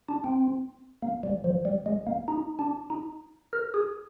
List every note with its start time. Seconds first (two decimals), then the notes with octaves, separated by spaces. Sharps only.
0.09 D4
0.24 C4
1.02 A#3
1.23 G3
1.44 F3
1.65 G3
1.86 G#3
2.07 A#3
2.28 D#4
2.59 D4
2.90 D#4
3.53 A#4
3.74 G#4